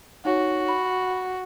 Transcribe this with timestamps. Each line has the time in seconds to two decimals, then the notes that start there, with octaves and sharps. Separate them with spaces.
0.25 D#4 F#4 C#5
0.68 B5